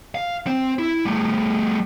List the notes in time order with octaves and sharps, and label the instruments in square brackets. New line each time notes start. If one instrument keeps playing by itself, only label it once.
[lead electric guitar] F5
C4
E4
G3 A3